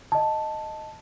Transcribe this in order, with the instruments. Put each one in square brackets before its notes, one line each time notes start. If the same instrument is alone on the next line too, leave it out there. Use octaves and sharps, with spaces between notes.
[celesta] D#5 A5